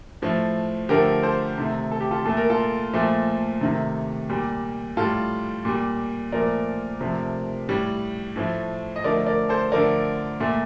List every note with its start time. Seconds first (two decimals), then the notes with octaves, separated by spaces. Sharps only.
0.22 A2 F3 A3
0.89 D3 F3 A3 G4 A#4
1.23 A4 C5
1.58 C3 D#3 A3
1.91 A4
2.01 G4
2.11 F4 A4
2.25 A#2 A3 A4
2.37 A#4
2.50 F4 A4
2.93 A#2 F3 A3
3.61 C3 D#3 A3
4.29 A#2 G3
4.97 A2 G3 F4 A4
5.65 A#2 G3
6.32 A#2 F3 A3 A#4 D5
7.01 C3 F3 A3
7.69 A2 G3
8.36 A2 F3 A3
8.96 D#5
9.04 D3 F3 A3 A#4 D5
9.27 A#4 D5
9.49 A4 C5
9.72 D3 F3 A3 A#4 D5
10.40 A#2 A3